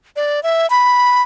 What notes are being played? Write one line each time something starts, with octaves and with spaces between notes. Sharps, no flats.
D5
E5
B5